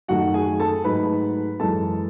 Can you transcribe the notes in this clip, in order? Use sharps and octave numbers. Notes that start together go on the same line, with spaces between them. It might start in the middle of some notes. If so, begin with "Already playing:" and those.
F#2 D#3 A3 F#4 F#5
G#4 G#5
A4 A5
G#2 F#3 A3 B4 B5
F#2 E3 G#3 A4 A5